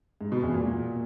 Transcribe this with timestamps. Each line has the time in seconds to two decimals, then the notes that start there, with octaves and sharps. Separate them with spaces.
0.21 G#2
0.32 B2
0.43 E2
0.54 A#2